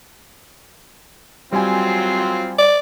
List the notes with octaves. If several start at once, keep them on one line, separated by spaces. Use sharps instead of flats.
F#3 G3 C4 F4 G#5
D5